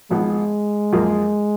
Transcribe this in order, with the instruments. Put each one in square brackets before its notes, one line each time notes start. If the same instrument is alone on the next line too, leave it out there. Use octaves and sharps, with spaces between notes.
[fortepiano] G#1 G#2 F3 B3 [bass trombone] G#3
[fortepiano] F#2 F3 A#3 F4 G#4